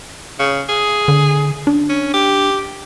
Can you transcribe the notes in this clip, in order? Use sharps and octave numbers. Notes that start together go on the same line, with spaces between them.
C#3
G#4
D3
D4
C#4
G4